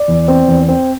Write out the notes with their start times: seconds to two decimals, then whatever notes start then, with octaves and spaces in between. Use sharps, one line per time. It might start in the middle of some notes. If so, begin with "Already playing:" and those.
Already playing: D5
0.08 E2
0.28 C4
0.48 E2
0.68 C4